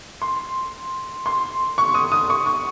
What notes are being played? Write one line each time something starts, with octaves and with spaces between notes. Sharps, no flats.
C6
C6
C#6
D#6
D#6
C#6
C#6